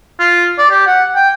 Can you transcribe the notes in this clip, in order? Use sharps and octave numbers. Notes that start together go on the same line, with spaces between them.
F4
D5
G4
F#5
G5